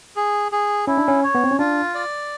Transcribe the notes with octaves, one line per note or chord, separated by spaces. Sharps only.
G#4
G#4
C#4 E4
D4
C#4
C#5
B3
C4
C#4
D4 F4
D5